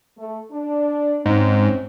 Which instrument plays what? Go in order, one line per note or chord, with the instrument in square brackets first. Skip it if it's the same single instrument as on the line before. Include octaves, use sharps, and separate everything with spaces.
[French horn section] A3
D4
[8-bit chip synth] G#2 [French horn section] C4 C#4